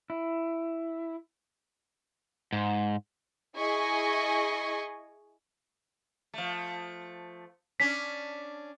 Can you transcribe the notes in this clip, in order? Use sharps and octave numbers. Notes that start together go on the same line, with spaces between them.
E4
G#2
E4 G#4 D#5 G#5 C#6
F3 A3
C#4 D4 B6